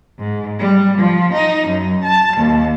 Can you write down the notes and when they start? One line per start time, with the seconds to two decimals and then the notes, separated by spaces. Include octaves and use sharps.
0.19 G#2
0.59 G3
0.99 F3
1.34 D#4
1.68 F#2
2.05 A5
2.38 D#2